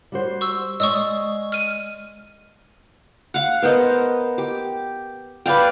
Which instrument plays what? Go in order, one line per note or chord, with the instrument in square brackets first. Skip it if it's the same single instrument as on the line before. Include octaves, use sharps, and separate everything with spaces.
[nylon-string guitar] G3 F#4 C5
[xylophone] C#6 E6
[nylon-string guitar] G#3 D5 D#5 [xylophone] C#6 D#6 E6
[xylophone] F6 D#7
[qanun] F5 F#5
B3 A#4 C5 D#5
G4
B4 D5 F5 G5